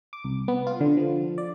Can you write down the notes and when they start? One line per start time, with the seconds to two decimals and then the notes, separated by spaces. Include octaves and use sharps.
0.13 D6
0.24 C2
0.48 B3
0.67 F4
0.81 D3
0.97 F3
1.38 D5